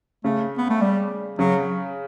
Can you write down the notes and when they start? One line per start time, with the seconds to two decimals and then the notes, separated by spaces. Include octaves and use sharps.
0.24 C#3 A3
0.58 B3
0.70 A3
0.81 G3
1.39 C#3 F#3